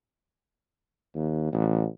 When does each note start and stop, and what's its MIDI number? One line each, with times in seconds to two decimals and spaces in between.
1.15 1.48 39
1.52 1.85 33